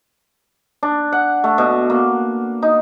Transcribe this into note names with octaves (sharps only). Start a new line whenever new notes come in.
D4
F#5
A3
B2
A#3
D#4